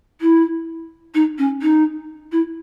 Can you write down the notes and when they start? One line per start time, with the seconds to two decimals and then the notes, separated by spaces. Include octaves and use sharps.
0.21 E4
1.14 D#4
1.38 C#4
1.62 D#4
2.31 E4